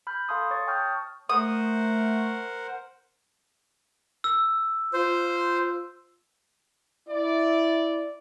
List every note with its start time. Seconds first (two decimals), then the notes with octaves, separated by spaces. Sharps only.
0.07 B5 F6 G6
0.29 A4 F5 A5 C6 D#6
0.51 C#5 C#6 A6
0.67 G5 A5 C#6 D#6 F6 G6
1.29 A3 A#4 C5 F#5 D#6
4.24 E6
4.93 F4 C5
7.09 E4 D5